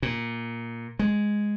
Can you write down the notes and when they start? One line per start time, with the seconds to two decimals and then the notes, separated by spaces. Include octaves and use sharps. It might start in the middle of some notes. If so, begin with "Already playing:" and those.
0.02 A#2
0.99 G#3